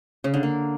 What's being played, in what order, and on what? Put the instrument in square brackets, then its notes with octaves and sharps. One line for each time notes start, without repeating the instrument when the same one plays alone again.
[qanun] C#3
D3
A#3